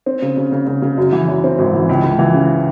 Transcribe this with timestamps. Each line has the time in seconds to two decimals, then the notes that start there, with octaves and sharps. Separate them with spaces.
0.06 C4
0.22 C#3
0.37 C#3
0.52 C#3
0.67 C#3
0.82 C#3
0.97 F#2
1.12 E3
1.28 F#2
1.44 C4
1.58 G#1
1.74 E3
1.89 C#2
2.04 C#2
2.19 E3
2.34 C#3